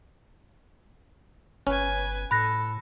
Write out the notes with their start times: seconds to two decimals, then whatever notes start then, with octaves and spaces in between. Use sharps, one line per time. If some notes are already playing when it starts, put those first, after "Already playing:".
1.67 G1 C#4 B4 G#5
2.31 A2 A4 B5 F#6 A#6